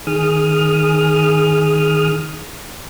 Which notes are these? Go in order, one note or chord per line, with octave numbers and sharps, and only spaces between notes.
D#3 G#4 D#6 F6